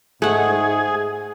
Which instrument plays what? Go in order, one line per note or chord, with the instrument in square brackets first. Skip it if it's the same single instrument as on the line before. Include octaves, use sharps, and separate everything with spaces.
[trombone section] G#2 [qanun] A3 F#5 [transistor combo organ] G#4